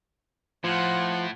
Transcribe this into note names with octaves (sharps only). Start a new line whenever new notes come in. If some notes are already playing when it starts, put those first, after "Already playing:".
A2 F3 F4 F#5